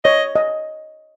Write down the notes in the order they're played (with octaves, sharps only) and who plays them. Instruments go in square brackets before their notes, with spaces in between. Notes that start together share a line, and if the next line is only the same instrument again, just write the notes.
[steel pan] C#5 [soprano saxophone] D#5
[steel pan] D#5